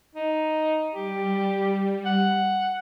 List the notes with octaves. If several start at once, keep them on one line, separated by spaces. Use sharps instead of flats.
D#4
G3 G4
F#5